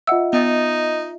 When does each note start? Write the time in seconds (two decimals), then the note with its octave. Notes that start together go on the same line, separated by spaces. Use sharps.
0.07 F4 D#5 E5 F#5 E6
0.33 B3 D#4 D#6 A6